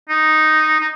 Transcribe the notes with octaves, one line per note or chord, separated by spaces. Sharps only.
D#4
D#4